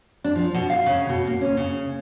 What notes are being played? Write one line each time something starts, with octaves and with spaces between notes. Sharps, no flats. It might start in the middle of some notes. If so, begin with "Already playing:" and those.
D4
F3
B2
F5
C#3
B2
A#3
C#4
C#3